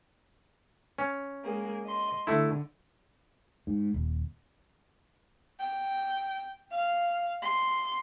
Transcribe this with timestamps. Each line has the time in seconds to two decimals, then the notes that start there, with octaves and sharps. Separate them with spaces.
0.98 C#4
1.44 G#3 A#3 G#4
1.85 D#5 C6
2.27 D3 A3 E4
3.67 G#2
3.94 D#1
5.60 G5
6.71 F5
7.42 C6